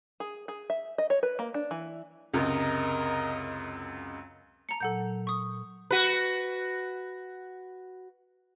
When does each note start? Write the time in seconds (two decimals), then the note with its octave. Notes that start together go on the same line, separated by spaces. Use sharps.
0.20 G#4
0.48 G#4
0.70 E5
0.98 D#5
1.10 C#5
1.23 B4
1.39 A#3
1.54 D4
1.71 E3
2.34 C#2 F#2 C3 A#4 D#5
4.69 A5 A#5 C#7
4.80 A#2 F#3 A4 F#5 G6
5.00 F#3
5.27 C#6 D#6
5.91 F#4 B4